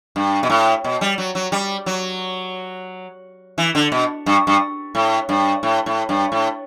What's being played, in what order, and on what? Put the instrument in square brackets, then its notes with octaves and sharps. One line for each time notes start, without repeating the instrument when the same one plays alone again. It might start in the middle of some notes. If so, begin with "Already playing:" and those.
[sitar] G2
B2
A2
B2
G3
F#3
F#3
G3
F#3
E3
D3
B2
G2
G2
A2
G2
A2
A2
G2
A2